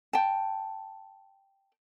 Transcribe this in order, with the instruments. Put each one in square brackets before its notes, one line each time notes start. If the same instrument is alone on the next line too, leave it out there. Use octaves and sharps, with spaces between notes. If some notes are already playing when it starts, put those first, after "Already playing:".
[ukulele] G5 A5